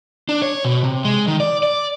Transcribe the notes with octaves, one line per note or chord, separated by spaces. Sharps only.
D4
C#5
B2
C3
G#3
D#3
D5
D5